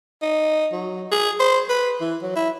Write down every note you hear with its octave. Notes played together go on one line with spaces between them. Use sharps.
D#4
F#3
G#4
C5
B4
E3
F#3
E4